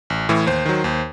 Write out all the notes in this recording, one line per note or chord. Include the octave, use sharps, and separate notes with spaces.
A1
A2 E3
D#2 C5
D#3 F#3
D#2